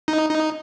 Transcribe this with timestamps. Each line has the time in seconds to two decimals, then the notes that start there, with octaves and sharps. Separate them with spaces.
0.08 D#4
0.30 D#4